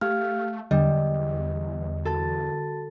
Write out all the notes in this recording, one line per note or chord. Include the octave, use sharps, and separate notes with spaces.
A3 G4 F5 F6
E2 D3 G3 D#5
F#4 A4 A5 A6